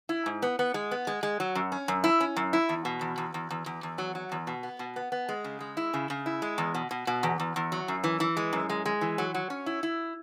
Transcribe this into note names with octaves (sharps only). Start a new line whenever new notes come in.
E4
G#2
B3
B3
G#3
B3
G#3
G#3
F#3
F#2
C#4
F#2
E4
C#4
F#2
E4
E2
B2
E2
E2
E2
E2
E2
E2
F#3
F#3
E2
B2
B3
B2
B3
B3
G#3
C#3
G#3
E4
C#3
C#3
E4
G#3
E2
B2
B2
B2
E2
E2
E2
F#3
F#2
E3
E3
G#3
F#2
G#3
G#3
E3
F#3
F#3
C#4
E4
E4